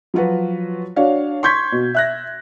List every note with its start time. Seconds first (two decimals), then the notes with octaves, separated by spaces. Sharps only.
0.14 F3 F#3 F4 F#4 B4
0.96 D4 F#4 C#5 F5
1.43 C6 C#6 G6 G#6 B6
1.72 B2
1.94 E5 F#6 A#6